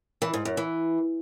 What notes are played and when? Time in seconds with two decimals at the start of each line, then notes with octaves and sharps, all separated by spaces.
0.22 E3
0.34 G#2
0.45 F#2
0.57 E3